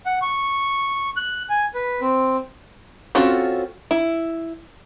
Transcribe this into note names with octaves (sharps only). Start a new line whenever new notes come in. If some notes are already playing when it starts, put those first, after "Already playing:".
F#5
C#6
F#6
G#5
B4
C4
C4 C#4 F4 F#4 A4
E4